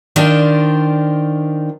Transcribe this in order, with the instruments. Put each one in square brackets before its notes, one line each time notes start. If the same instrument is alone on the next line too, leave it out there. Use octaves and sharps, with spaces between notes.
[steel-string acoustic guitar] D#3 D4 F4 C5